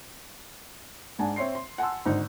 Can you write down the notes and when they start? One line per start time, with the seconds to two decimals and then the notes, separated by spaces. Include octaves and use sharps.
1.19 G#2 D4 F#5 G#5 A5
1.36 C4 C#5 E5 C6 C7
1.55 C6
1.78 F#5 G#5 A5 C6 E6
2.06 G#1 D3 D#4 C5